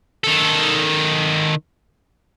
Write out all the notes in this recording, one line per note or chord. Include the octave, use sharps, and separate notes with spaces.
D#3 A4